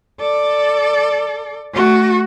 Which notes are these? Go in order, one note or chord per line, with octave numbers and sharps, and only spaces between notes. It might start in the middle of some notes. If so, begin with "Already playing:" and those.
A4 D5
A3 F#4